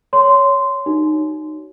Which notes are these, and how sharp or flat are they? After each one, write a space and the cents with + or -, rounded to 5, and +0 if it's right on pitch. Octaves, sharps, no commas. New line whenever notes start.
C#5 +10 C6 -10
D#4 -15 F#4 +35